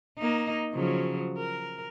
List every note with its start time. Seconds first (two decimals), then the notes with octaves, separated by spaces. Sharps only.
0.18 A#3 D#4
0.74 C#3 F3 F#3
1.38 A#4